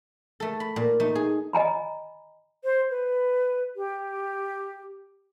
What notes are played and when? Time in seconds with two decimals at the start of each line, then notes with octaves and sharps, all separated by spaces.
0.40 A3 A4
0.60 B5
0.76 A#2
1.00 A3 D#4
1.15 G#4
1.53 D#5 G#5 A#5 B5
2.64 C5
2.90 B4
3.76 G4